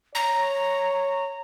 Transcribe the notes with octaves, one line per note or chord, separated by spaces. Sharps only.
C#5 A#5